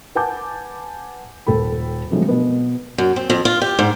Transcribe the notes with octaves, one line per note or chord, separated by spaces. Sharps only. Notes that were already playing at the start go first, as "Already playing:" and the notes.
B4 F#5 G#5 A5 D6 G6
D#1 A4 G5 B5
D3 F3 F#3 G#3 A3 C4
B2 B3
F#2
C4
F2
F4
G4
G#2